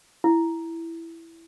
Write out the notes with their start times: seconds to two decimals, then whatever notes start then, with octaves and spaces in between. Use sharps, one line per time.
0.24 E4